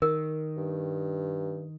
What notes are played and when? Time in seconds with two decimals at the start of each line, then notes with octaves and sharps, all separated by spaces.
0.02 D#3 A#4
0.57 G2